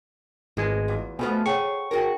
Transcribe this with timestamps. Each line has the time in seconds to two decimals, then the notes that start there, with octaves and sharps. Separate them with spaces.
0.57 G#1 D#2 G#3 F4 B4 G#5
0.88 E2 F#4 F5 D6
1.19 B2 F3 A3 B3 G#5 B5
1.46 G#4 C#5 F#5 G5 C#6
1.91 D#4 F#4 G#4 A#4 G5